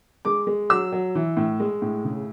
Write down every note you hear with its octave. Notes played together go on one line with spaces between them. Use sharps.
G#3 D6
G#3
F#3 E6
F#3
E3
A2
G#3
A2
C#3